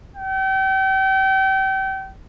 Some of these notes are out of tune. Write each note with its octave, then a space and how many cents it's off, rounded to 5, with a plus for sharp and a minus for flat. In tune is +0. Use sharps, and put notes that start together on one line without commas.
G5 -35